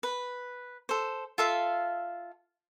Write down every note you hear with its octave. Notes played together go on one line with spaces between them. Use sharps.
B4
A4 C5
F4 A4 E5 F5